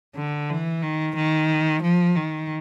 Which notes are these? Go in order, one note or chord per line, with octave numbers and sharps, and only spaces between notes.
D3
E3
D#3
D#3
F3
D#3